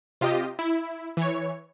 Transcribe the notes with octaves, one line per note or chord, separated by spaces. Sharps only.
C3 F4 G4 D#5
E4
E3 C#5